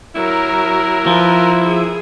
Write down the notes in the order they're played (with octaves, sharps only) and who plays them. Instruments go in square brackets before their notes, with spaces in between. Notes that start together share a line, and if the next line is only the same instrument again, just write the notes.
[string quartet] F#3 [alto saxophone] E4 [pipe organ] A#4
[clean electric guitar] F3 [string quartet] B4
[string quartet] G#4